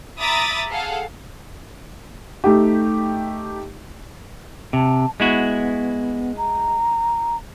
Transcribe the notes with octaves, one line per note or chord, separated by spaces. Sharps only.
E5 A#5 B5 D6 D#6 A6
G#4 A4 F5 F#5
A3 D#4 G4
C3 A5
G#3 B3 E4 F#4
A#5